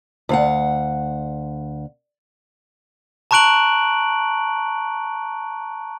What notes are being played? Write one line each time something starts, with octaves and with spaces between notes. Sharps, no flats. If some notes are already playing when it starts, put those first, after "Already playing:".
D2 F5 F#5
A5 A#5 C#6 F#6 D7 F#7